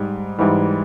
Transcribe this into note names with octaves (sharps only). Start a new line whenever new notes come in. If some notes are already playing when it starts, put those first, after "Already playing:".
Already playing: G#2 G3
G#2 E3 G3